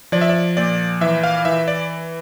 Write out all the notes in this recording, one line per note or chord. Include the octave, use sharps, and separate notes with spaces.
F3 D5
E5
D5
A#2 D5
E3 E5
F5
E3 E5
D5